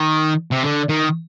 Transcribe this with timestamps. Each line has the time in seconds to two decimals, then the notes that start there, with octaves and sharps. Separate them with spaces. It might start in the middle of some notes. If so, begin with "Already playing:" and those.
Already playing: D#3
0.51 C3
0.63 D3
0.89 D#3